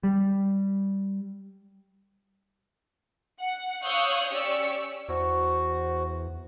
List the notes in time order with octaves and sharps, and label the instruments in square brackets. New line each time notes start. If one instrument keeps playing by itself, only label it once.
[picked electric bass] G3
[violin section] F#5
C#5 F5 D#6 E6 F#6 G6
C#4 G4 C#5 D5 E6 C#7
[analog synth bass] E2 [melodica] F#4 [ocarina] C5